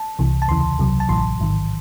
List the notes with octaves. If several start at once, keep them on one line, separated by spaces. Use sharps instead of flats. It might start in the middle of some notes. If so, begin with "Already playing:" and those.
Already playing: A5
C2 C3 E3
A5
D#2 C#3 E3 C6
C2 C3 F#3
A5
A1 A2 E3 C6
A1 G#2 D#3